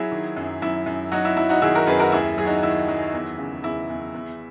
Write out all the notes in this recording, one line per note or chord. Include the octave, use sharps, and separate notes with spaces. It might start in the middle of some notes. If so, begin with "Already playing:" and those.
Already playing: F#3 E4 G#4
D#3
F#2
F#2 E4
F#2
F#3 D#4 F#4
E4
F#3 E4
D#4 F#4
D#3 E4 G#4
F#4 A#4
F#2 G#4 B4
F#4 A#4
D#2 E4 G#4
F#3 G#4
D#4 F#4
D#3 E4
F#3
E2
C#3
E2 E4
E2
E2